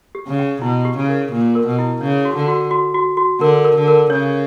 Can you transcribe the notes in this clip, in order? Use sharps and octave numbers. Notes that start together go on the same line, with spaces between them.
G4
C#3
G5
B2 E4
G4
C#3
A#4
A#2 G4
A#4
B2
E4
C#3 C#5
F#4
D3
F#4
F#4
F#4
F#4
D3 A#4
A#4
D3
A#4
C#3 C#5